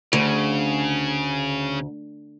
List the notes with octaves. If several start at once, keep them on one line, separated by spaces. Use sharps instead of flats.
D2 C#3